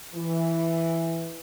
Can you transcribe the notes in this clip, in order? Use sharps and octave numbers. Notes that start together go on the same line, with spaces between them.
E3